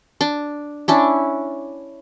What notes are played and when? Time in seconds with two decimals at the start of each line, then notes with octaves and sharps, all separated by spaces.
0.21 D4
0.88 C#4 D4 E4